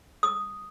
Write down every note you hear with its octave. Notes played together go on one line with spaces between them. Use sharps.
D#6